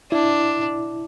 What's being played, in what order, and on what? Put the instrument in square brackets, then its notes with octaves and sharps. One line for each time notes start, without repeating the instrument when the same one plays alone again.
[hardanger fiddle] D4 [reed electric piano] E4